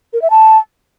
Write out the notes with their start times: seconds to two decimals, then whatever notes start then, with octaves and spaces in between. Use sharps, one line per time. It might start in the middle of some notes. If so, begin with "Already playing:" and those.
0.13 A#4
0.22 E5
0.30 A5